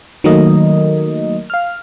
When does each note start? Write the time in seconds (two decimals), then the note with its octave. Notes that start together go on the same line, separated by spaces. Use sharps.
0.24 D#3 F#3 A3 A#3 A#4 D#5
1.50 F5 F6